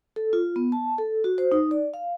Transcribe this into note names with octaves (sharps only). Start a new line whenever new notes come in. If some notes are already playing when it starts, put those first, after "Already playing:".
A4
F4
B3
A5
A4
F#4
C5
D#4
D5
F5